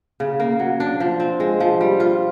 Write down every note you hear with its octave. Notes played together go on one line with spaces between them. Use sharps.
C#3
A#3
F#3
D4
F3
C4
G#3
F3
G3
F4